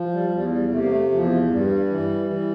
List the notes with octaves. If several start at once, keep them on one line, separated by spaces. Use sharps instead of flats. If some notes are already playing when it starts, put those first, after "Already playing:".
Already playing: F3
G3
E2 G3
G3
C3 A3
A#3
A3
E2 F3
G2 G3
E3
E3